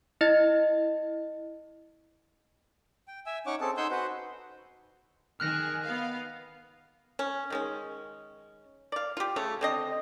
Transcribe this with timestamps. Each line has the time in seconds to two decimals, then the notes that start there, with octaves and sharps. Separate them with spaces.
0.21 E4 D#5 A6
3.08 G5
3.26 E5 G#5 E6
3.46 C#4 D#4 C#5 F#5 C#6 D6
3.61 C4 C#4 G#4 A4 A5
3.77 D#4 F#5 G#5 C6 E6 G6
3.91 F#4 B4 C5 F#5
5.40 D#3 G#4 F6 F#6 A#6
5.83 B3 F5
7.19 C#4
7.50 D#3 G#3 C#4
8.92 D5 F5
9.17 F4 G4
9.36 C#3 A3 C#5
9.61 D3 C4 D#5